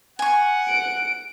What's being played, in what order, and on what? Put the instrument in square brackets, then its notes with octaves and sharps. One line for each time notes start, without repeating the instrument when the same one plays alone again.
[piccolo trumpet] F#5 [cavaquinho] G#5 C#6
[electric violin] D7